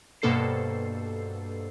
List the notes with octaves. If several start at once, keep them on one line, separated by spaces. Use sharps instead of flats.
G2 B2 A#3 A4 C5 C7